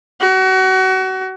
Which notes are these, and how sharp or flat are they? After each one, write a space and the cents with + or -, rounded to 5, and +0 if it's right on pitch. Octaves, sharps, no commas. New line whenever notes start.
F#4 +30